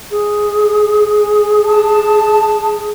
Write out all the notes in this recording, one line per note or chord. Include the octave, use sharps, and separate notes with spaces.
G#4
A5